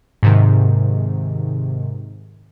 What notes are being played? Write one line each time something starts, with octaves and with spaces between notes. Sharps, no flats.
G#2 C3 D#3